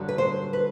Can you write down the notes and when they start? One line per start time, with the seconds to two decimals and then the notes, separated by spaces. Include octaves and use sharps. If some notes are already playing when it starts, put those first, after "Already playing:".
Already playing: G2 D3 F#3
0.09 B4
0.18 C5
0.53 B4